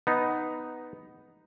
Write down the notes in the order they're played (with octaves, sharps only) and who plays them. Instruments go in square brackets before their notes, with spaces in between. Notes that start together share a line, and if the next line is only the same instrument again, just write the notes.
[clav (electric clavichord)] B3 D#4